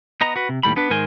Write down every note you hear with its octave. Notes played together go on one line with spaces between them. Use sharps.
B3 D#5 A#5
F#4 B4
C3
D#2 A2 G3 B5
B3 D4 B4
G#2 D#3 A#4 C5 G#5 C6